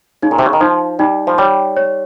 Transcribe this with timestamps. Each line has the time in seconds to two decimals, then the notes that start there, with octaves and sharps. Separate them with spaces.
0.22 C#3 D#4
0.31 A#2
0.39 C3
0.46 C#3
0.53 D#3
0.61 F3 D#4
0.99 G3 D#4
1.27 F3
1.38 G3 C#5
1.77 C#5